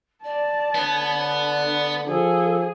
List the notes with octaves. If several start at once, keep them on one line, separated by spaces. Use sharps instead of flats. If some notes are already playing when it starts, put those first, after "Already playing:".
D5 A5
D3 B3 C#5
D5
F3 G#4 A4